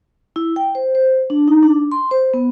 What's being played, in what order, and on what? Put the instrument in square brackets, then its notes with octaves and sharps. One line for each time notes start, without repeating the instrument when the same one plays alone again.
[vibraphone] E4
G5
C5
C5
D4
D#4
D4
C6
C5
B3